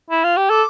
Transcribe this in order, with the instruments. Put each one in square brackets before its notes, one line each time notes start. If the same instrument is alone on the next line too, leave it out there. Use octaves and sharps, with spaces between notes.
[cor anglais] E4
F4
G4
[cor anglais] A4 [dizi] D6